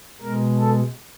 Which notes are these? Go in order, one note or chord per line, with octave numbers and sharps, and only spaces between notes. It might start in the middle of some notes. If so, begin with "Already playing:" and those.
B2 G#3 A#4
A4